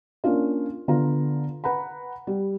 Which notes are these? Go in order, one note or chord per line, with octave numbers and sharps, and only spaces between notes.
A#3 C#4 D4 F4
D3 B3 F4 A#5
B4 F#5 A#5 B5
G3